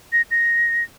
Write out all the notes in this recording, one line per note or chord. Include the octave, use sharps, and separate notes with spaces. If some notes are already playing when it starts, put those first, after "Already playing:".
A#6
A#6